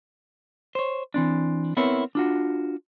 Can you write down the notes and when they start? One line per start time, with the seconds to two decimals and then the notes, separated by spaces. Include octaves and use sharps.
0.75 C5 C#5
1.14 E3 C4 D4
1.77 B3 C4 E4 A#4 B4 C#5
2.15 D4 F4 F#4